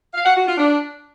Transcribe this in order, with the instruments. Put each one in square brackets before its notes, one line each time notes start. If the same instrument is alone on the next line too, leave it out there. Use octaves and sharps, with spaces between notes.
[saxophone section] F5
F#5
F#4
F4
D4